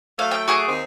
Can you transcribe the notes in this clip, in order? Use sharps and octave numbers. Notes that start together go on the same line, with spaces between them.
F#3 A3 F5
G5
F#4 G#4 D6
D#2 D#3 C4